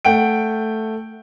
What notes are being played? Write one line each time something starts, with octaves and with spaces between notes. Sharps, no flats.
A3 F#5 G5 D7